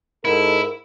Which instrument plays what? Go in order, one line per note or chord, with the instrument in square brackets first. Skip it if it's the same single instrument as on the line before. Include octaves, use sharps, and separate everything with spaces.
[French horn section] G#2 A4 A#4 [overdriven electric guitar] E4